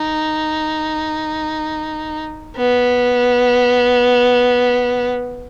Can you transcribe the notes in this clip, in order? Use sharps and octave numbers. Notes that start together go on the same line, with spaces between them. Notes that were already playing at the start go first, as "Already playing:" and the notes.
Already playing: D#4
B3